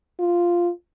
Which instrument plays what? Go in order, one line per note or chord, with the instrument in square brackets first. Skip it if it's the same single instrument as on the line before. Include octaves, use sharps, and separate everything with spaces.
[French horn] F4